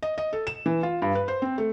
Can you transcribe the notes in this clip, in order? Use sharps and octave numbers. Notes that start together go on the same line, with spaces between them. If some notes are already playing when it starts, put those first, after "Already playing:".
D#5
D#5
A4
E7
E3
F4
G2
B4
C5
C4
A3